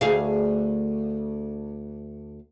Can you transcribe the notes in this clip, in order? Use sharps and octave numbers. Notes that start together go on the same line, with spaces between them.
D2 G#4 F5